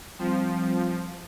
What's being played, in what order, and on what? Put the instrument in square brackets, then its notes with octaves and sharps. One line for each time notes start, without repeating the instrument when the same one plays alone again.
[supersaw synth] F3 [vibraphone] G3 C4